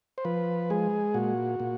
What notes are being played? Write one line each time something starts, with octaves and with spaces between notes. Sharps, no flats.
C5
F3 B4
G#3 G#4
A#2 F#4
A#2